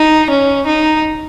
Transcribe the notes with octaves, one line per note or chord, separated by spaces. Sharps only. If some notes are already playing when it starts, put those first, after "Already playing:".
Already playing: D#4
C#4
D#4